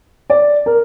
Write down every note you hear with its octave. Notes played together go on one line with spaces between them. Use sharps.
D5
A#4